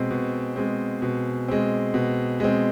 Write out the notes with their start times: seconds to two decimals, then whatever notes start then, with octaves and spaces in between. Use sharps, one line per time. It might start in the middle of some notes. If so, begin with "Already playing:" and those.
Already playing: B2 G#3 C4
0.10 B2
0.56 G#3 C4
1.02 B2
1.48 G#3 C4
1.94 B2
2.40 G#3 C4